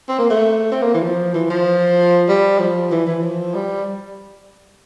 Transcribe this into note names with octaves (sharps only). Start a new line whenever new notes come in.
C4
A#3
A3
C4
A#3
E3
F3
E3
F3
G3
F3
E3
E3
F3
G3